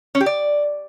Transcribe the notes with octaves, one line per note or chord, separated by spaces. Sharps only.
C#4
G4
D5